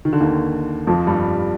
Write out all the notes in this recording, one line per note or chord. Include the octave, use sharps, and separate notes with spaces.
D#3
D3
D#2 D#3
F2 F3
G2 G3